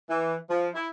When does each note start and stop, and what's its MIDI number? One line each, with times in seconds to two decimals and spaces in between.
0.10 0.36 52
0.50 0.69 53
0.75 0.88 64